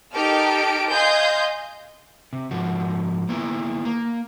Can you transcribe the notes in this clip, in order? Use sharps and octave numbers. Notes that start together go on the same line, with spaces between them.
D#4 G4 A4 A#4 F6 D7
D#5 F5 G#5 C6 D#6 G6
C3
G#2 F3 F#4
A#3 B3 E4
A#3